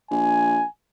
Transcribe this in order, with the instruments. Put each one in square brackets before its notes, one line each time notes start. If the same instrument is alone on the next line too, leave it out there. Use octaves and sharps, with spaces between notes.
[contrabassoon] A#1 [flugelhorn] G#5